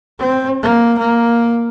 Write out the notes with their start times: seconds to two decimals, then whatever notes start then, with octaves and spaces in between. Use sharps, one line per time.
0.20 C4
0.63 A#3
0.98 A#3